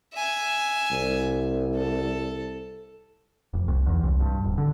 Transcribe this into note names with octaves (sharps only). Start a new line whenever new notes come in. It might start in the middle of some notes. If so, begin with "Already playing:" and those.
E5 G#5
C2
A4
F1
C2
E2
C2
G2
D1
D3